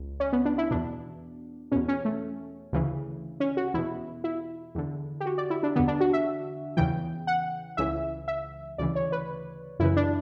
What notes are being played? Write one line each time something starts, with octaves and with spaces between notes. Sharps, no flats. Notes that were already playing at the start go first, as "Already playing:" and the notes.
Already playing: C#2
C#4
B3
D4
E4
E2 B2 D4
E2 B2 C#4
C#4
A3
D2 C#3 E3
C#4
F#4
E2 B2 E4
E4
E2 D3
G4
F#4
D5
E4
D4
E2 D3 B3
D4
F#4
E5
E2 C#3 E3 G5
F#5
C#2 C#3 E3 E5
E5
D2 C#3 E3 D5
C#5
B4
F#2 C#3 E3 E4
D4